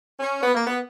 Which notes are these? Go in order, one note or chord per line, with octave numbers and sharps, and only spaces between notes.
C#4
B3
A#3
B3